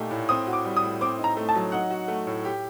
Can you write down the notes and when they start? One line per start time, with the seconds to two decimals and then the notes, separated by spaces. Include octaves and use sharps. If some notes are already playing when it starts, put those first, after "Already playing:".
Already playing: A#2 A3 D#4 G4
0.11 A2
0.29 C4 D#6
0.47 F#4
0.53 D6
0.65 G3
0.77 D#6
0.82 A2
1.01 C4 D6
1.18 D#4
1.24 A#5
1.37 A3
1.49 A5
1.55 F#3
1.72 D#4 F#5
1.90 F#4
2.08 A3
2.27 A2
2.45 G4